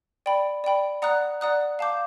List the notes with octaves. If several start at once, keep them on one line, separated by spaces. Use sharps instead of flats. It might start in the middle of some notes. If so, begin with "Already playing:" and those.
D5 G5 B5
D5 G5 B5
D5 F#5 A#5 D#6 F#6
D5 F#5 A#5 D#6 F#6
F5 A5 D6 G6